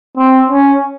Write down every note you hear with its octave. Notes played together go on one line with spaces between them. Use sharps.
C4
C#4